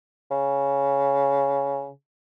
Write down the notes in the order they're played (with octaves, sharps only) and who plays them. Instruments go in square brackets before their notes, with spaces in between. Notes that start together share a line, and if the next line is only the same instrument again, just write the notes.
[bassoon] C#3